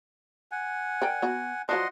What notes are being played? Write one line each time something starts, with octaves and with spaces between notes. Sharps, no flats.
F#5 G#5
A#4 D5 G5
B3 F#4
F3 F#3 D4 D#5 F#5 C6